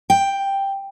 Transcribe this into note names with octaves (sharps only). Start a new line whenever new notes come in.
G5